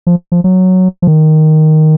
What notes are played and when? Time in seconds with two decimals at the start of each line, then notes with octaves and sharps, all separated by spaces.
0.07 F3
0.32 F3
0.44 F#3
1.02 F3
1.07 D#3